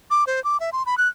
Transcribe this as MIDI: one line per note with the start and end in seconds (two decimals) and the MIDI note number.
0.11 0.24 86
0.27 0.43 72
0.44 0.60 86
0.60 0.70 76
0.73 0.83 84
0.86 0.98 83
0.98 1.08 90